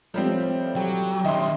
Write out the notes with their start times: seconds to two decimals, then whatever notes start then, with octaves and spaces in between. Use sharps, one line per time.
0.14 A2 F3 G3 C4
0.76 F#3 G4
1.24 D#3 C#4 E4 D#5 C6